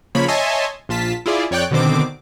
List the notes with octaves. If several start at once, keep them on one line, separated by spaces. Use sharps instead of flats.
C#3 F3 A#3 C#5 B5
C#5 D#5 E5 G#5 A5 C6
A#1 F4 A5 B6
E4 F4 G#4 D5
F2 C#5 D5 G5 F#6
B2 D3 D#3 C4 D6